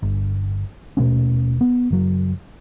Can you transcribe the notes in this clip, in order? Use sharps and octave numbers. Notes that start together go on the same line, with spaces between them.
G1
D#1 B2 A3 C#4
B3
F#1 F#3